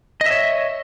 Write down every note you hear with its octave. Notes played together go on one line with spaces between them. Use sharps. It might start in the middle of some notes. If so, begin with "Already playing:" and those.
C#5 D#5 E5